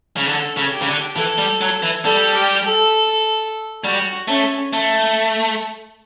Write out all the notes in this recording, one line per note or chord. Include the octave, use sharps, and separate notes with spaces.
C#3
D3 A4
C#3
G4
C#3
D3
E3 A4
G3
F#3
E3
G3 A4
G4
A4
G3 F#4
A3 C#4
A3